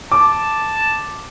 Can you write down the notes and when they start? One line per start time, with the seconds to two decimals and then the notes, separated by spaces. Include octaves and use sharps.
0.12 A5 D6